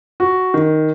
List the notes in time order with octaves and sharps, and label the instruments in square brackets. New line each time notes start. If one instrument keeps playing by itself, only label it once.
[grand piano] F#4
D#3